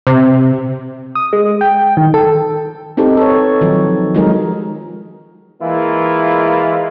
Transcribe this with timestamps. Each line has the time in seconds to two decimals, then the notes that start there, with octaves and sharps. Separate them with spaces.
0.07 C3
1.15 D#6
1.33 G#3
1.61 G5
1.97 D#3
2.14 A4
2.97 C4 D#4 G4 A4
3.17 A4 B4 C#5
3.61 D#3 F3 F#3
4.14 F3 F#3 G#3 D#4 G#4 A#4
5.61 E3 G#3 A#3 E4 F4